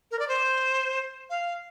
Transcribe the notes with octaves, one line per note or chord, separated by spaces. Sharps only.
A#4
D5
C5
F5